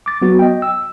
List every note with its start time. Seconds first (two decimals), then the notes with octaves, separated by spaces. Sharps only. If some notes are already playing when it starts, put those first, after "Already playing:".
0.06 D6 A6
0.22 F#3 B3 F#4
0.39 D#5 G5
0.62 E6